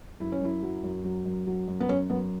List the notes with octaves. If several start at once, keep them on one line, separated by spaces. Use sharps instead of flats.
F#2 E4
C#4
F#2 E4
F#3
F#2
F#3
F#2
F#3
F#2
B3
F#2 C#4
F#2 B3